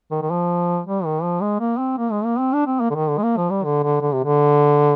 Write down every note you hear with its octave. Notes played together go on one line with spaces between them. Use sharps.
D#3
D#3
F3
G3
D#3
F3
G#3
A#3
C4
A#3
G#3
A#3
C4
D4
C4
A#3
D3
D#3
D3
G#3
A#3
F3
G3
D3
D3
D3
C3
D3